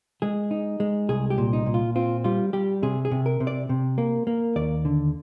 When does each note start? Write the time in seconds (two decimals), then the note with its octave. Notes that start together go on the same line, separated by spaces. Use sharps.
0.22 G#3 G#4
0.51 D#4
0.80 G#3
1.09 C2 G#4
1.30 G4
1.38 A#2
1.53 D#4
1.66 A#2
1.74 F4
1.96 C4 F4
2.24 G3 F4
2.53 G3 G4
2.83 C3 G#4
3.05 G#4
3.11 C3
3.26 A#4
3.40 C3
3.47 D5
3.69 C3
3.98 A#3
4.27 A#3
4.56 D#2 D5
4.85 D3